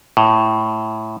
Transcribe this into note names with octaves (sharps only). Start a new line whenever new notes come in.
A2